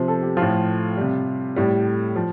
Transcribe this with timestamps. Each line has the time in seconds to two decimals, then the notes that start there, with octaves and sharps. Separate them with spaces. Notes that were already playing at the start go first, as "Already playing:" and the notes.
Already playing: C3 F3 C5
0.08 A4
0.22 G4
0.37 A2 F3 F4
0.97 C3 G3
1.56 A2 G3
2.16 F3